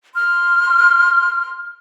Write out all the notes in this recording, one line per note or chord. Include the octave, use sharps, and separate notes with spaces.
C6 F6